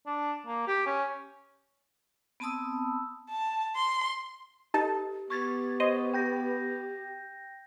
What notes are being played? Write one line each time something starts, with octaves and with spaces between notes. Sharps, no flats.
D4
A#3
G4
C#4
B3 C4 A5 B5 D#6 E6
A5
C6
D#4 G4 A4 A5
B3 G4 C#6 G#6 A6
C5 D#5
G5 G6 A#6